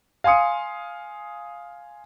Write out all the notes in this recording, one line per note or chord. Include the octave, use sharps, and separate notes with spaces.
F5 G#5 C6 D#6 C#7